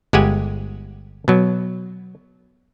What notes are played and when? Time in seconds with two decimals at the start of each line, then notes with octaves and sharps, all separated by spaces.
0.13 G1 G#3 G4 F#5 G#5
1.28 B2 F#3